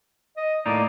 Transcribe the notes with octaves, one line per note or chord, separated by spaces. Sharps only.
D#5
A2 A#3 D#4 D5